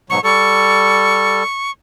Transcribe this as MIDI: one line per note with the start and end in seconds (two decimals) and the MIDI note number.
0.10 0.19 44
0.10 0.19 47
0.10 0.19 54
0.10 0.23 85
0.24 1.43 55
0.24 1.43 69
0.24 1.71 85